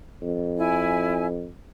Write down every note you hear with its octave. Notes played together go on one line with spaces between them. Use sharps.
F2
E4 G#5